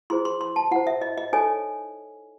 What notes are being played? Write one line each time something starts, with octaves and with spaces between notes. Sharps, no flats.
E4 G#4 C5 C6
C6
C6
A5
E4 C5 F#5
E5
D#5
D#5
D#4 A4 C#5 G#5